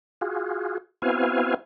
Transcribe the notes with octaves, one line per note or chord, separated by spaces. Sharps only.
F4 F#4 G#4
B3 C4 E4 F#4 F5 G#5